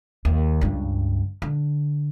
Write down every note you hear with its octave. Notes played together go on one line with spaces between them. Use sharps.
D#2
C#2 G2
D3